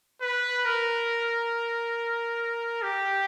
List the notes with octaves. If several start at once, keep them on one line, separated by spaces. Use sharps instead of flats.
B4
A#4
G4